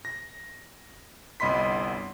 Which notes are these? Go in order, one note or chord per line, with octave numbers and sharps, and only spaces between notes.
A#6
G1 C2 D#5 B5 C6 B6